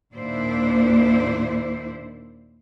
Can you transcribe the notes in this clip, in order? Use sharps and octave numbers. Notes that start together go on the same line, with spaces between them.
D#2 A#2 D4 E4 C5 D5